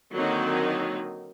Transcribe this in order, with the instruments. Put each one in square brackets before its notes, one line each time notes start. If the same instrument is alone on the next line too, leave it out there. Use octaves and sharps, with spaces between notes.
[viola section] D3 D#3 F#3 A#3 C4 D#4